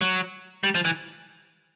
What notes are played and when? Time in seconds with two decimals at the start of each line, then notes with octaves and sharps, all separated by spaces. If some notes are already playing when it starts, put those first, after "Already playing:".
0.01 F#3
0.64 G3
0.75 F3
0.85 E3